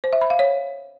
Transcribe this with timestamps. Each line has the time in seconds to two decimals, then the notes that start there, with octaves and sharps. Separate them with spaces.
0.04 C5
0.13 E5
0.21 B5
0.30 F5
0.39 C#5